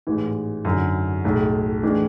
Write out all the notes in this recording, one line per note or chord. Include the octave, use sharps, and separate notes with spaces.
A1 G#2 E3
G#1 F#2 D3
B1 A2 G#3
A2 E3 G#3 D4